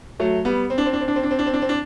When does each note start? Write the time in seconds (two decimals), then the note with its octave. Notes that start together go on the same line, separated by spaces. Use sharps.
0.20 F#3 A3
0.45 G3 B3
0.70 C4
0.78 D4
0.86 C4
0.93 D4
1.01 C4
1.08 D4
1.16 C4
1.23 D4
1.31 C4
1.39 D4
1.46 C4
1.54 D4
1.62 C4
1.69 D4